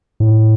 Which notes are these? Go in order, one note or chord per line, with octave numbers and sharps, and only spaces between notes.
A2